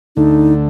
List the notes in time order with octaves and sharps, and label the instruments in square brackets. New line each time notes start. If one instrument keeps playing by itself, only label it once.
[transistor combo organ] D2 D3 A3 [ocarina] D#4